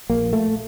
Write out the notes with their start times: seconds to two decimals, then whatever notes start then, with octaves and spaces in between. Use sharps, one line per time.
0.09 A#1 A#2 A#3
0.33 A3